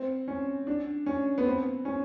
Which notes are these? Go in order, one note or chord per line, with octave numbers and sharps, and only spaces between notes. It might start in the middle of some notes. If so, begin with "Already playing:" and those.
Already playing: C4
C#4
D4
C#4
B3
C4
C#4